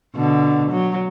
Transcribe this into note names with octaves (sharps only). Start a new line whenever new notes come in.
B2 D3
F#3